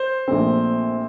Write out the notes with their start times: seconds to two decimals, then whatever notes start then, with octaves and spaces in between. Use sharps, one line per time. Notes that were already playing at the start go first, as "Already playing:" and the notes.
Already playing: C5
0.28 A#1 A#2 A3 C4